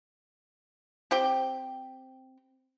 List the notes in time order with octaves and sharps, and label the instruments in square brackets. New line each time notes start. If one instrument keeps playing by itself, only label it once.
[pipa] C4 G4 G5